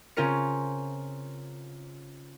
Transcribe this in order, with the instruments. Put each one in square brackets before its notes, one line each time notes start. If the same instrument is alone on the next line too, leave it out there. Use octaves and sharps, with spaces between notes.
[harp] C#3 C4 C#4 F4 A#4 C#7